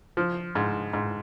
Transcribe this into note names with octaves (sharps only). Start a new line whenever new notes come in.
F3
G#2
G#2